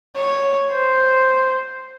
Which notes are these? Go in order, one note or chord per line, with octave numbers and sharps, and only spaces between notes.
C#5
C5